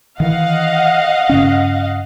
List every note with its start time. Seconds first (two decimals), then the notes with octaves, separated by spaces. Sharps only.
0.20 D#3 E3 D#5 F5 F#5
1.29 G2 C#3 C#4